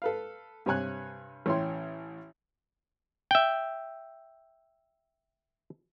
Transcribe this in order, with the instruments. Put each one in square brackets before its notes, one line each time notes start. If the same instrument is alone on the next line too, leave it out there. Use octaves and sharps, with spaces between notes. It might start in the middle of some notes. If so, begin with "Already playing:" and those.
[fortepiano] A4 B4 F5
G2 C3 C#5 G#5 F#6
A1 C#4 E4 C#5 G5 C6
[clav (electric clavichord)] E5 G5